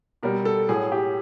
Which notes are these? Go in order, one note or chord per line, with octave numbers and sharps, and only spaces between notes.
B2 G3 A#4
A4
A2 F#3 G#4
G4